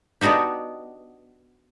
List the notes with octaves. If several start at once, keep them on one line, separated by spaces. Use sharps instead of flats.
B3 D4 D#4 F#4 G4